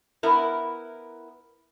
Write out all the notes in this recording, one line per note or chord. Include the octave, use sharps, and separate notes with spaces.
B3 E4 A#4